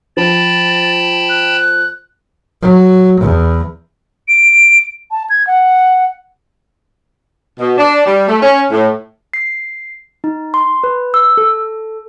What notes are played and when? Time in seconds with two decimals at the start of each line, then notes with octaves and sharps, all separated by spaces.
0.17 F3 G5 A5 B5 A6
1.29 F#6
2.62 F#3
3.21 E2
4.28 D7
5.11 A5
5.30 G#6
5.47 F#5
7.60 B2
7.78 D4
8.05 G3
8.27 A3
8.42 C#4
8.71 A2
9.34 C7
10.24 D#4
10.54 C6
10.84 B4
11.14 E6
11.37 A4